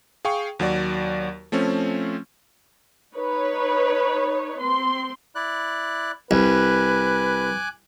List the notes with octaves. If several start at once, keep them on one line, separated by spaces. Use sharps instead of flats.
G#4 F5 G5 C#6
D#2 F#3 F#4 D5
F3 A3 C4 C#4
D#4 B4 C#5
C4 C6
E4 D5 F#6
C2 B4 G#5 D6 F#6